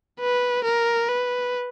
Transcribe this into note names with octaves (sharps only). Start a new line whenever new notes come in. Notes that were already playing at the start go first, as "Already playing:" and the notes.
B4
A#4
B4